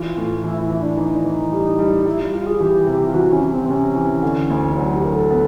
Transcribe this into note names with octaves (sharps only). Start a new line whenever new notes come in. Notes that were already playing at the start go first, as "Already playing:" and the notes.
Already playing: E3 F4
A2
E3 E4
E4
E3
D4
E3 D#4
E3
G3
G3
G3 E4
F4
G3 F4
G#4
E3 G4
C3
F4
E3 F#4
C#4
E3
C4
C3 C#4
E3
D3
D2
D#4
F#3 D4
G4
F#3 A#4
A4
B3